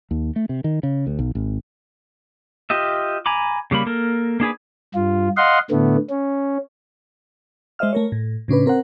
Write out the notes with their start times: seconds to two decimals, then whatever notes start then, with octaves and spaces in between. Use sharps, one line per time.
0.11 D#2
0.36 A3
0.49 C3
0.64 D#3
0.83 C#3
1.07 D2
1.19 B1
1.35 G#1
2.70 F4 G4 D#5 E5
3.26 G#5 A#5 B5 D6
3.71 C#3 G3 A#3 B5
3.86 A#3 A4 A#4
4.40 A#3 D4 G#4 B4
4.95 G2 F4
5.37 D#5 F5 F#5 C6
5.71 A2 D3 A3 B3
6.09 C#4
7.79 G#3 C5 D#5 E5 F6
7.93 A3 A#4 C#5
8.12 A2
8.48 A2 C#3 C#4 D4 B4
8.66 C4 A#4 C5 F#5